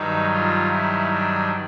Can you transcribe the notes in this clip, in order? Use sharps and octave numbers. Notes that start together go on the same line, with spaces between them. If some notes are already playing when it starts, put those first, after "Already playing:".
Already playing: G2 D#3 F#3 D#4
F4
E4
D4